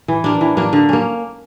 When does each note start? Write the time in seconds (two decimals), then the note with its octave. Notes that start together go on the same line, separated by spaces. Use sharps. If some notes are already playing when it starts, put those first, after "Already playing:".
0.08 E3
0.24 A#3 D4
0.41 E3
0.57 A#3 D4
0.73 D3
0.89 A#3 C#4